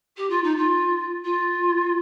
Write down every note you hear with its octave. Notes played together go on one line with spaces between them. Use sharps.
G4
F4
D#4
F4
F4